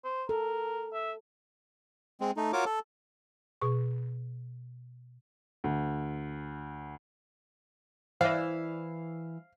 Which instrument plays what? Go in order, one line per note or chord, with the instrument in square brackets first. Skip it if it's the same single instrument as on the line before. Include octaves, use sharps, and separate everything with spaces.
[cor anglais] C5
[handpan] A4 [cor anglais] A#4
[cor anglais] E5
[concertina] G#3 C4
A3 D#4
F4 F#4 A#4 C#5 D6
A4
[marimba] B2 G#4 C#6
[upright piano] D2
[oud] E3 E4 D5 [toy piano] C5 E5 [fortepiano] F5